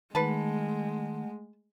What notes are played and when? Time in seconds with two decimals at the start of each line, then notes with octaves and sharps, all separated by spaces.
0.15 D#3 G#3 A3 B4 F#5 A5